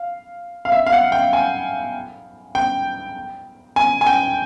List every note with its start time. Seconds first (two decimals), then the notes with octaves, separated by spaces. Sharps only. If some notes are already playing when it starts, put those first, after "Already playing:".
Already playing: F5
0.65 F5
0.72 E5
0.86 F5
0.92 F#5
1.12 G5
1.33 G#5
2.55 G5
3.76 G#5
4.01 G#5
4.07 G5